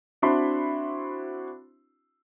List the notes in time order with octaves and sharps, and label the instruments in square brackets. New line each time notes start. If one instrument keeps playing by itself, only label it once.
[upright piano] C4 D4 E4 F#4 B5 C6